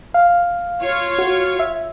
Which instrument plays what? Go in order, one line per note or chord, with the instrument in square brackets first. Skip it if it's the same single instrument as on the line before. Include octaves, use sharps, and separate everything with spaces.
[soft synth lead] F5
[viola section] F4 C#5
[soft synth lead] F#4
E5